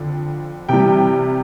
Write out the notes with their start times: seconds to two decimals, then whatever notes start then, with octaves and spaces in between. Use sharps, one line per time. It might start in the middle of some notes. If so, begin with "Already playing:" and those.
Already playing: F2 D3 F3
0.69 C3 E3 G3 G5